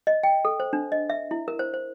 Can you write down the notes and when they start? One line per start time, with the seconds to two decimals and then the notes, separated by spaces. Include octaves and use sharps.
0.07 D#5
0.23 G5
0.45 A4
0.60 C5
0.73 D4
0.92 D#5
1.10 E5
1.31 E4
1.48 A#4
1.59 C5
1.74 C5